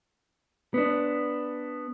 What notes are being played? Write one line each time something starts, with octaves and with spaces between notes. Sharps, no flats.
B3 D4